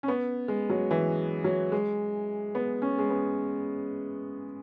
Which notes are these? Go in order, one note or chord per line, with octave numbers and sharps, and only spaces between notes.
C#4
B3
G#3
F#3
E3
F#3
G#3
B3
C#4
G#3
B3